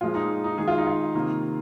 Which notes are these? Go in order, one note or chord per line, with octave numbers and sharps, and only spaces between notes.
A#2 F3 G#3 F4
D#4
D#4
D#3 G#3 G#4
F4
D#4
F4
C3 D#3 A#3